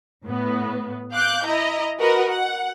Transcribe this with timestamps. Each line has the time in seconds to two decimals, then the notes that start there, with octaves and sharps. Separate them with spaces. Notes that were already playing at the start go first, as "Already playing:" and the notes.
0.25 A2 B3
1.13 F5 D6 F#6 G6
1.45 E4 D#5 A#5
2.00 F#4 A#4 B4 D#5 F#5
2.28 F#5